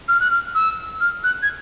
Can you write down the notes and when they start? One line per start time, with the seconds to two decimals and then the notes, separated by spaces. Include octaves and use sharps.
0.08 F6
0.20 F#6
0.31 F6
0.55 E6
1.01 F6
1.24 F#6
1.42 G#6